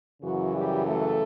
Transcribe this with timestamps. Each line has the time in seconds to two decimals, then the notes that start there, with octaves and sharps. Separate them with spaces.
0.22 F#2 C#3 E3 F#3 F#4
0.53 G3 G4
0.85 A3 A4